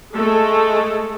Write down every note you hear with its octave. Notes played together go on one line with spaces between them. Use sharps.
G#3 A3 A4